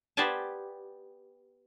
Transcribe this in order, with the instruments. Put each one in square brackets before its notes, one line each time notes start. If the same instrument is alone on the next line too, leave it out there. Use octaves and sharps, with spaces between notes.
[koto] B3 G4 C5 D5 G#5 A5